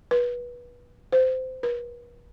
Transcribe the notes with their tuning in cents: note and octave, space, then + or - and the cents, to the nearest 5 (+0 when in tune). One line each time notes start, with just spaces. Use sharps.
B4 -20
C5 -20
B4 -45